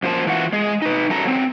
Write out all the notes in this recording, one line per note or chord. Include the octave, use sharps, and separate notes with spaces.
F#2 F3 A#3 C5 A5
E3 F4 F#4 F#5
G#3 G#4
D#4 B4
F#2 F#3 A4 A#5
F#3 C4